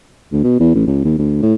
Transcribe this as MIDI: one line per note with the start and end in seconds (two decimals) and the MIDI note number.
0.32 0.43 38
0.44 0.56 47
0.60 0.74 40
0.75 0.86 33
0.87 1.02 37
1.04 1.14 39
1.18 1.40 38
1.42 1.54 45